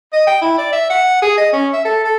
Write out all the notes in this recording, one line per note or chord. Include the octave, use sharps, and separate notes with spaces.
D#5
G5
E4
D5
E5
F#5
G#4
D#5
C#4
E5
A4
A4